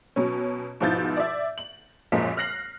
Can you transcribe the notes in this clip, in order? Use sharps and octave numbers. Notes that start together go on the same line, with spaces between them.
B2 F#3 C#4
G#2 B2 F3 E4 G6 A6
D5 E5
F#7
F#2 A#2 F3 G#3 A#4 B6
F6 F#6 A#6 C7 F#7